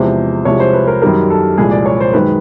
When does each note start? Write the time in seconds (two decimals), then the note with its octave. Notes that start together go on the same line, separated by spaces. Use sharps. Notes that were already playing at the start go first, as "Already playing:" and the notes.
Already playing: E2 C3 F3 G#3 C5
0.45 C2 C3 F3 G#3 C#5
0.60 C5
0.73 B4
0.88 A#4
1.02 F#2 D#3 G3 A#4
1.30 A4
1.58 C2 A#2 F3 G#3 G#4
1.71 D5
1.86 C#5
2.01 C5
2.13 F#2 D#3 G#3 B4